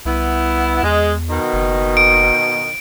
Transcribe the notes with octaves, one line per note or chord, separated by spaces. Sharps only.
C2 B3 E4
E2 G#3
B2 D#3
F#1
D7